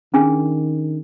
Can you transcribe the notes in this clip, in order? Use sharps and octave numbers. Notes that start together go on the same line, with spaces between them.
D#3 C#4 D4 G#4